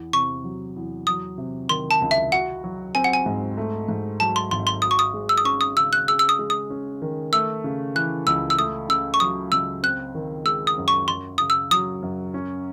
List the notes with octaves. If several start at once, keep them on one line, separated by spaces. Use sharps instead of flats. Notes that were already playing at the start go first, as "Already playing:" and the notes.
Already playing: E2
C3 C#6
F#3
E2
F#3 D#6
C3
D#3 C6
A5
C#2
E5
F#4 F#5
F#3
C4 G#5
F#5
G#5
G#2
A3
G#2
F#3 A5
C6
G#1 C6
C6
F#4 D#6
C#6
D#6
G#3
E6
D#6
C#4 C#6
D#6
C#3 E6
F#6
G#4 E6
E6
D#6
G#3
D#6
C#4
D#3
A3 E6
C#3
E3 F#6
C#2 E6
E6
A3 D#6
C#3 E6
C#6
F#3 D#6
C#2 E6
C4 F#6
D#3
G#3 E6
D#6
F#2
C#6
F#2 C6
C#3 D#6
E6
F#3 D#6
F#2
C#4